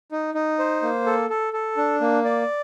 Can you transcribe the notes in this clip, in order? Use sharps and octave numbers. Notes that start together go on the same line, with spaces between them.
D#4
D#4
C5
A#3
A4
A4
A4
D4
A#3
D5